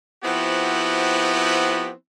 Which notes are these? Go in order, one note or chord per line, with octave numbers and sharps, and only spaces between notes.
F3 B3 C4 E4 F#4 G4